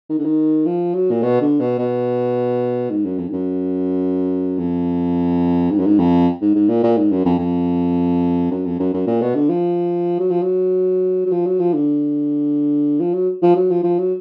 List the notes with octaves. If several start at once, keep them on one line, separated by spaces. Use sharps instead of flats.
D#3
D3
D#3
F3
F#3
A#2
B2
D3
B2
B2
G#2
F#2
F2
G#2
F#2
F2
G#2
F#2
G#2
F2
G#2
G#2
A#2
A#2
G#2
F#2
F2
F2
F#2
F2
F#2
F#2
A#2
B2
D3
F3
F#3
F3
F#3
F#3
F3
F#3
F3
D3
F3
F#3
F3
F#3
F3
F3
F#3